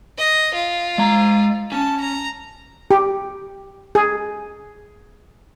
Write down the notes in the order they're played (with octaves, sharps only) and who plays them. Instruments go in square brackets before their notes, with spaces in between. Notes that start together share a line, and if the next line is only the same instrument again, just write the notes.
[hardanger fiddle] D#5
F4
[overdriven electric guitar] G#3 A#5
[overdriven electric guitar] C#4 [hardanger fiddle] A5
[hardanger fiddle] A#5
[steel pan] G4
G#4